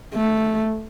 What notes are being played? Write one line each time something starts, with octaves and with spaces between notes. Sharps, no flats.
A3